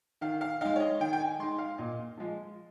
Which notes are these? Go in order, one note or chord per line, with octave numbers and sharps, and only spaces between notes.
D#3 F5
F5
G#3 D#4 F5
C#5
D#5
D#3 G5
G5
G#5
G#3 D#4 C6
F5
A#2 D#5
F3 G#3